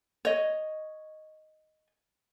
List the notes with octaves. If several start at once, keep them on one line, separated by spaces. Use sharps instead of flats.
C#5 D#5